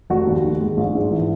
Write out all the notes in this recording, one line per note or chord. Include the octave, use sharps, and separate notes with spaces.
F1 F#4
D#2
D#3
G#3
A#1
G#2
E3